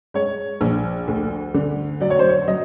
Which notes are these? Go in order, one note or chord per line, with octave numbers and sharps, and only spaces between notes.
G#3 C#5
A#1
D2
D3
F#3 D5
C#5
C5
C#5
F#3 D#5